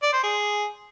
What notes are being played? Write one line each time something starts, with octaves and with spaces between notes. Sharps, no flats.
D5
C5
G#4